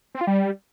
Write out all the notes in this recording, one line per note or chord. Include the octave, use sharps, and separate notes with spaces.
C4
F4
G3